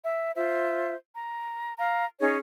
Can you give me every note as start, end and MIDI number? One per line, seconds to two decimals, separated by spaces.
0.03 0.33 76
0.35 0.95 65
0.35 0.95 72
0.35 0.95 76
1.16 1.74 82
1.78 2.05 77
1.78 2.05 82
2.21 2.38 61
2.21 2.38 63
2.21 2.38 68
2.21 2.38 73